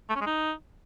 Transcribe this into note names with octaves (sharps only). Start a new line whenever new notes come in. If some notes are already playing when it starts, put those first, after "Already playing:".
A3
C#4
G#3
D#4